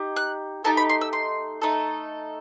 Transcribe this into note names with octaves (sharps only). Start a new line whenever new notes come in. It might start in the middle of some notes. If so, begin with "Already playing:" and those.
Already playing: D#4 G4
F#6
A3 D#4 G4 A5
B5
C6
E6
C6
A3 D#4 A4